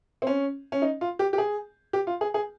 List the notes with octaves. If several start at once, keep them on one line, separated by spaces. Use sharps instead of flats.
C4
C#4
C#4
D#4
F4
G4
G4
G#4
G4
F4
G#4
G#4